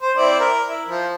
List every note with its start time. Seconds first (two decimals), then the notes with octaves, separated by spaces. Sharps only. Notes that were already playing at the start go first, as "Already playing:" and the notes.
0.02 C5
0.17 C4 E4 D5
0.39 A#4
0.68 E4
0.89 F3